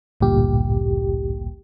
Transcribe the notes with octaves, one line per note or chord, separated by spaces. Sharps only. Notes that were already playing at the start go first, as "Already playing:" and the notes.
A1 D2 G2 A#2 G4